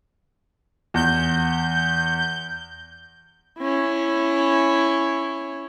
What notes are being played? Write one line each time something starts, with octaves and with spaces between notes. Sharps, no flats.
E2 G6
C#4 E4